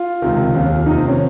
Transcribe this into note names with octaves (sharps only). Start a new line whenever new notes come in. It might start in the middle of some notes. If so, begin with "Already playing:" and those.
Already playing: F4
C#2 C3 D#3
D#2 C#3 F3
F2 C3 D#3 D#4
C4
C#4